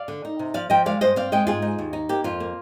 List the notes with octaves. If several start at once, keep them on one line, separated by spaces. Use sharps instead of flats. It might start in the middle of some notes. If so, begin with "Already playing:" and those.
Already playing: D5 F5
D3
D#4
C3
F3 D5 F5
F3 D#5 G5
G#3 D5 F5
G2 C5 D#5
C4 D5 F5
G#3 D#5 G5
G#2 F4 G#4
D#4
D#2
D#4
A#3 G4
F2 F4
A#3